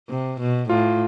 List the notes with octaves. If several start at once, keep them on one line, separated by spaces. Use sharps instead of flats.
C3
B2
A2 F4